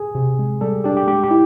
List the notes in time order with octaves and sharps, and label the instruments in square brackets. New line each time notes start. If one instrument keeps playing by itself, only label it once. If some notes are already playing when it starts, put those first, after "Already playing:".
Already playing: [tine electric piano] G#4
[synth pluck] C3
G#3
[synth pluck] G3 [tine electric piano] A4
[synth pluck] D4 [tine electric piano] G4
[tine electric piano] G4
[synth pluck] G#3 [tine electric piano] G4
[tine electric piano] G4
[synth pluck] E4